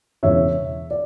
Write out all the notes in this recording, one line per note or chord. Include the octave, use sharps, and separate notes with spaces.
E1 E2 C#3 C#5 E5
D5